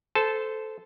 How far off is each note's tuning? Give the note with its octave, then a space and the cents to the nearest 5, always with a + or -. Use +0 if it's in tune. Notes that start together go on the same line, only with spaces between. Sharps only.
A4 -10 C5 -20 A5 -15